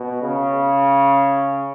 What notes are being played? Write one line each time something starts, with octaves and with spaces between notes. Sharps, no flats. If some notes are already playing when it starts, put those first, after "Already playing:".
Already playing: B2
C#3